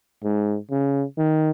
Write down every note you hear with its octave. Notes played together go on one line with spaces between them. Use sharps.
G#2
C#3
D#3